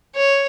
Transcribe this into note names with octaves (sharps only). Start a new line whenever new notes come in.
C#5